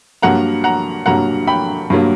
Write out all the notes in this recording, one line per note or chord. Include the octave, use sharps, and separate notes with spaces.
G2 F#3 A#3 F#5 A#5
F#5 A#5
G2 F#3 A#3 F#5 A#5
G5 B5
G2 F#3 A#3